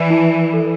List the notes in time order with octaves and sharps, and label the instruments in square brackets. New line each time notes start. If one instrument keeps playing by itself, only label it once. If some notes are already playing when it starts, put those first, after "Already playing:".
Already playing: [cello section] E3 [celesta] D5
[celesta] E4
A4